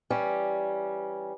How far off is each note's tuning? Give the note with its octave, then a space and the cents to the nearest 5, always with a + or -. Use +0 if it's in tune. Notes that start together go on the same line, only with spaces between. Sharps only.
E3 +5 G3 -5 C#4 +0